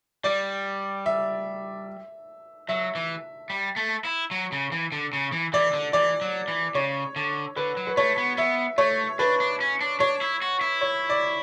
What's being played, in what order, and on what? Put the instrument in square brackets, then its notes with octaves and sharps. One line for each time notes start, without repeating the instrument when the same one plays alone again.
[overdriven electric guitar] G3 [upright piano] D5
[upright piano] E5
[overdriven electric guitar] F#3 [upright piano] E5
[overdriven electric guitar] E3
G3
A3
E4
F#3
C#3
E3
D3
C#3
E3
[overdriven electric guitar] E3 [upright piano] D5
[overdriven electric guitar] D3
[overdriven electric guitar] E3 [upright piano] D5
[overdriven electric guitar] F#3
E3
[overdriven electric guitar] C#3 [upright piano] C#5
[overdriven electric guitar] D3
[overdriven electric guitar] D3 [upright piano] B4
[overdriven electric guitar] F#3
[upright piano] B4
[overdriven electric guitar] A3 [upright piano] C#5
[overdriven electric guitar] B3
[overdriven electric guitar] B3 [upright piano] E5
[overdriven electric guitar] A3 [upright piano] C#5
[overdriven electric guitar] D4 [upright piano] B4
[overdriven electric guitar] D4
C#4
D4
[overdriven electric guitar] D4 [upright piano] C#5
[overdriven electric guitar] E4
F#4
E4
[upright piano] C#5
D5